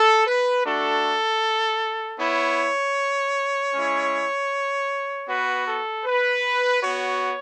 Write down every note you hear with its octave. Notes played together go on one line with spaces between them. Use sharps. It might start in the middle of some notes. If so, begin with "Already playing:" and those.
Already playing: A4
B4
A3 D4 F#4 A4
B3 E4 C#5
G#3 C#4 E4
B3 F#4 B4
A4
B4
B3 F#4 C#5